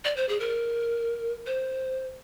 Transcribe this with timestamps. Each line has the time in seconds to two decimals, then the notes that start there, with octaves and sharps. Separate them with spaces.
0.05 D5
0.16 C5
0.29 G#4
0.40 A#4
1.46 C5